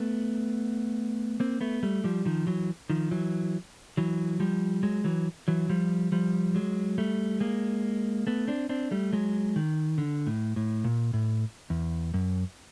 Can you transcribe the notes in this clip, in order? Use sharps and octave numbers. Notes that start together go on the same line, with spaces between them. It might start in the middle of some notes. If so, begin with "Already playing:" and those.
Already playing: A3 B3
A#3 C4
A3 B3
G3 A3
F3 G3
D#3 F3
E3 F#3
D#3 F3
E3 F#3
E3 F#3
F3 G3
F#3 G#3
E3 F#3
E3 F#3
F3 G3
F3 G3
F#3 G#3
G3 A3
G#3 A#3
A3 B3
C4 D4
C4 D4
G3 A3
F#3 G#3
D#3
D3
A2
A2
A#2
A2
E2
F#2